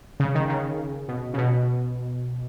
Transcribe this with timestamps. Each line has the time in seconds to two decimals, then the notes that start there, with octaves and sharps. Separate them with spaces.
0.20 C#3
0.35 D#3
0.49 C#3
1.08 B2
1.34 C#3
1.38 B2